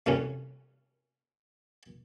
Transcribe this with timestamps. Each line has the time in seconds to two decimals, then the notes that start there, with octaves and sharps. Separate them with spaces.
0.06 C2 F#2 A2 G3 C#4